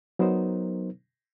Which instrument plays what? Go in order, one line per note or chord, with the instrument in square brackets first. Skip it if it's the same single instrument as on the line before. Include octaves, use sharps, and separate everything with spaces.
[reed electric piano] F#3 B3 D#4 A#4 C5